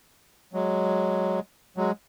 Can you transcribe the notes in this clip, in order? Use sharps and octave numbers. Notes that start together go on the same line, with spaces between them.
F#3 G#3
F#3 G#3